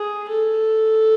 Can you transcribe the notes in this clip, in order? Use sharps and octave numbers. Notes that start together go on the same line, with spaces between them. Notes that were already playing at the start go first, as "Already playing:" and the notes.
Already playing: G#4
A4